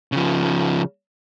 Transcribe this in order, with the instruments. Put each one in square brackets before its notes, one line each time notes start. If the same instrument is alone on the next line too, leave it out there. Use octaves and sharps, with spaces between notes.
[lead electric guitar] C#3 F3